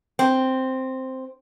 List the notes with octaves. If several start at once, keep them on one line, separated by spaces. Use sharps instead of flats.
C4